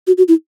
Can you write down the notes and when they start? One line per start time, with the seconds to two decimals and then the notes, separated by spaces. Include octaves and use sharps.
0.07 F#4
0.18 F#4
0.28 E4